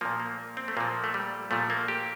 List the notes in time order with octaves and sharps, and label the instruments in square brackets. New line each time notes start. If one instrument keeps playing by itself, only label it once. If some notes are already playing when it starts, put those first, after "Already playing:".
[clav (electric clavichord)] A#2 F3 A#3
A#3
C4
A3
A#2 F3 A#3
A3
G3
A#2 F3 A3
A#3
G4